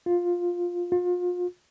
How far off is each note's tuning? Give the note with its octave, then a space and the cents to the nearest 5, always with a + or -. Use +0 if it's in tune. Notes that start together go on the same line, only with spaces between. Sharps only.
F4 +10
F4 +35